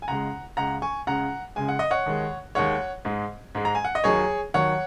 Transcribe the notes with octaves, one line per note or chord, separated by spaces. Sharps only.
G#5
C#2 C#3 G#3 F#5 A#5
C#2 C#3 G#3 F#5 A#5
G#5 C#6
C#2 C#3 G#3 F#5 A#5
C#2 C#3 G#3 G#5
F#5
D#5
C#5 F#5
D#2 D#3 G#3
D#2 D#3 G#3 C#5 F#5
G#2 G#3
G#2 G#3
A#5
G#5
F#5
D#5
D#2 D#3 F#3 G#4 C#5
D#2 D#3 F#3 C#5 F#5